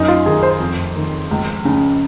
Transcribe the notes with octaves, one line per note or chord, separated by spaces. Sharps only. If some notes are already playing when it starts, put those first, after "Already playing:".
Already playing: F#2 D#4
F4
D#3 G#4
C5
F2
D#3
C#2
C#3